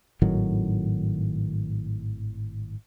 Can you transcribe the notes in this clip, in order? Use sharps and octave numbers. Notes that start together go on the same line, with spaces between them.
G#1 A2 D#3 F#3